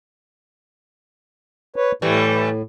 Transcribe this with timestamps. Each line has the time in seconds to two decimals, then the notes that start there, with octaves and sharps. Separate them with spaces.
1.76 B4 C#5
2.02 A2 E3 G3 A3